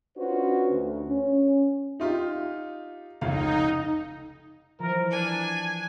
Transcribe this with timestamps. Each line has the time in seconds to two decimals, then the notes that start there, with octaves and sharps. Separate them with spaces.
0.17 C#4 D4 F4 F#4 B4 C5
0.70 D2
1.07 C#4
2.00 D#4 F4 G4
3.21 F1 C#2 D#4 F5
4.79 E3 F3 A#4
5.11 D4 G#5